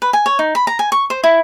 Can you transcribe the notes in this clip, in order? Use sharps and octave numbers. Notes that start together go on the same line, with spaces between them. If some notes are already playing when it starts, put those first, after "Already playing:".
B4
G#5
C#5
D#4
B5
A#5
G#5
C#6
C5
E4